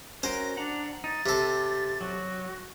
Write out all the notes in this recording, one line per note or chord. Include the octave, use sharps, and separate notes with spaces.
C#4 F#4 A#4 C5
D4 F#5 A#5
D#4 A6
C3 G4 A4
F#3 F#4